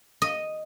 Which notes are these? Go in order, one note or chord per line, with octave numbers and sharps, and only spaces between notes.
D#5